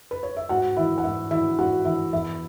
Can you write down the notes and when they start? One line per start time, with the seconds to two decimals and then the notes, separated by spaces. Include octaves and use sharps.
0.11 B4
0.23 C#5
0.37 E5
0.49 G#2 F#4 F#5
0.76 E3 E4 E5
0.98 F#5
1.04 G#2 E4 E5
1.31 E3 E4 E5
1.59 G#2 F#4 F#5
1.85 E3 E4 E5
2.13 E2 E4 E5